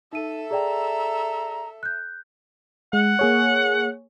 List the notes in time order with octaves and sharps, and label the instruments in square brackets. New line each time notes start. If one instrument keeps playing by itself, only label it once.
[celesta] D#4 D#7 [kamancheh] A4 E5
[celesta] G#4 D5 G5 [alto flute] A#5
[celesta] F#6 G6
[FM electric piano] G#3 [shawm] F#5
[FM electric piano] A#3 G#4 C#5